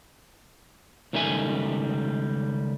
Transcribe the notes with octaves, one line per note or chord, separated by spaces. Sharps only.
C#2 D#3 G3 A3 E5 G#5